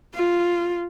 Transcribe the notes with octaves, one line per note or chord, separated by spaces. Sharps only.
F4